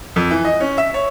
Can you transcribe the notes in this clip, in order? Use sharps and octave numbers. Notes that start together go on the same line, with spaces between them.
F2
E3
D#5
C#4
E5
C#5